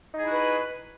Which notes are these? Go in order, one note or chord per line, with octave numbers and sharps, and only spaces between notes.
D#4 E4 F#4 G#4 B4